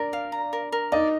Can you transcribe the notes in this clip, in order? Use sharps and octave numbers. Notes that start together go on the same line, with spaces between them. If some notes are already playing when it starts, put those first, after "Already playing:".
Already playing: D4 A#4 D5
F5
A#5
A#4
A#4
D#4 D5 D#5